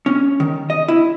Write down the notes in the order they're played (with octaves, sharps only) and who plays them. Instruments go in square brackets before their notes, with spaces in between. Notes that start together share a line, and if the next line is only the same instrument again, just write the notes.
[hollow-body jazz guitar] C#4
D#3
D#5
E4